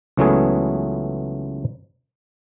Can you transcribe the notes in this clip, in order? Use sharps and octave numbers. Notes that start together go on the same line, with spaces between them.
C#2 E3 F#3 A3 B3 G#4